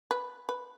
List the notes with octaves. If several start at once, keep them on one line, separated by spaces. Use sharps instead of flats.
B4
B4